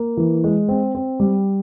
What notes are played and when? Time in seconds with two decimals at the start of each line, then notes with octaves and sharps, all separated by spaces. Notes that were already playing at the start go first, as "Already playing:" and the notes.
Already playing: A#3
0.17 E3
0.44 G#3
0.69 C4
0.95 C4
1.20 G3